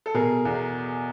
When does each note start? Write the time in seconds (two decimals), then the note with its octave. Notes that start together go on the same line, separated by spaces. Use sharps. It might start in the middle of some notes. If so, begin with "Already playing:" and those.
0.06 A4
0.14 B2 G#4 A#4
0.45 E2